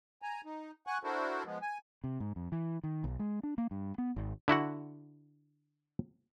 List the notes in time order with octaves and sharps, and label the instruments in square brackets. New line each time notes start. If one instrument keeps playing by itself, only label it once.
[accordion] G#5 A#5
D#4
F#5 G#5 C#6 F#6
D4 E4 F#4 A4 A#4 C5
F3 G#3 B3
G#5
[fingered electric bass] C3
G#2
F2
E3
D#3
B1
G#3
D4
A#3
G2
B3
G#1
[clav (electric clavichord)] D3 E4 F#4 F#5